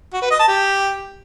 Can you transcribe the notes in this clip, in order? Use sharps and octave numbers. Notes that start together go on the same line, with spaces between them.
F#4
B4
D#5
A5
G4